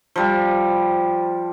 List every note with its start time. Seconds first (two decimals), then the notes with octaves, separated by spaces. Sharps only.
0.16 F3 G3